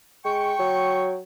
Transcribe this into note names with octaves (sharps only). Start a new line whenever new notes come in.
G#3 G5 C#6
F#3